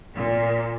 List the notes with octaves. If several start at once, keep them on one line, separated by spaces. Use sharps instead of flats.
A#2